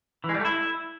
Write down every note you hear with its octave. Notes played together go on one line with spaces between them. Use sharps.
E3
G#3
G3
A3
E4